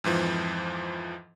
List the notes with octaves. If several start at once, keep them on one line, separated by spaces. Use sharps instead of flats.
F2 G#2 E3 F3